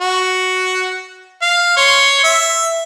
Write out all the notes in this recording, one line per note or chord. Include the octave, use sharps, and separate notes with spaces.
F#4
F5
C#5 C6
E5